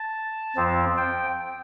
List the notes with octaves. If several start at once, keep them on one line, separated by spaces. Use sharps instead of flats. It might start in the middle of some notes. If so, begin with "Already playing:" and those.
Already playing: A5
F2 F3 C4
G5